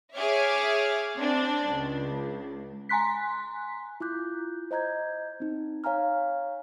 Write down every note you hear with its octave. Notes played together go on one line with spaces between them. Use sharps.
G#4 C#5 E5 D6 F6
C4 D4
C#2
G#5 A#5 C6 F#6 B6
E4 F4 D6 F#6 G6
C5 D#5 A#5 G6 G#6
C4 D#4
C#5 F5 G#5 A#5 F6